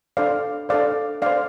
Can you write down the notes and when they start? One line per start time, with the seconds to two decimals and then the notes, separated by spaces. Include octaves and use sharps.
0.17 D4 A4 C5 D5 F5
0.69 D4 A4 C5 D5 F5
1.22 D4 A4 C5 D5 F5